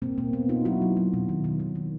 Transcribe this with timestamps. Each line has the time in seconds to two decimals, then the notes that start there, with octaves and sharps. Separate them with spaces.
0.02 B2 A#3 C4
0.18 B2 A#3
0.33 B2 B3
0.49 B2 D#4 F4
0.65 F#3 E4 F#4
0.82 F#3
0.97 F#3
1.13 B2
1.29 D#3
1.44 D#3
1.60 D#3
1.75 D#3